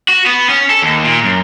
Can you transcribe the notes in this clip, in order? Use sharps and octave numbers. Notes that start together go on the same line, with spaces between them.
F#4
B3
C#4
A4
D#2
A#2
F#2